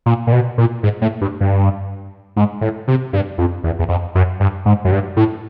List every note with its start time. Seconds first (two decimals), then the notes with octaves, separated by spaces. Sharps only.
0.06 A#2
0.27 A#2
0.32 B2
0.58 A#2
0.83 G#2
1.02 A2
1.21 G2
1.40 G2
2.36 G#2
2.61 A2
2.88 C3
3.13 G2
3.38 F2
3.64 E2
3.79 E2
3.89 F2
4.15 F#2
4.40 G2
4.66 G#2
4.84 F#2
4.92 G2
5.17 A2